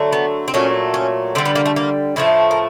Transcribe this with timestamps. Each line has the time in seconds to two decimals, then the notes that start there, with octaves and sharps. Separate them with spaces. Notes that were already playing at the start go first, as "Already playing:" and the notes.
Already playing: D3 F#3 A3
0.13 B3
0.48 C4
0.54 A#2 F#3 A3 C#4
0.94 C#4
1.35 D3 C4
1.38 G3
1.45 B3
1.55 A#3
1.66 A3
1.76 A#3
2.16 A2 F3 A3 E4
2.51 A#4